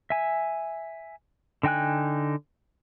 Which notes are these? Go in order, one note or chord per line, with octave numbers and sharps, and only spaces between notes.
E5 G#5
D3 D#4 G5 G#5 F#6